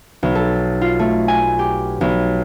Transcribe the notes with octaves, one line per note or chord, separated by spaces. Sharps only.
B1
A4
F4
A3
G#5
G4
B1